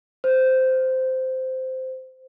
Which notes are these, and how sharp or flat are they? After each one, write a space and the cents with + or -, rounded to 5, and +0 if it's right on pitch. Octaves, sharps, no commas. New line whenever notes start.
C5 -10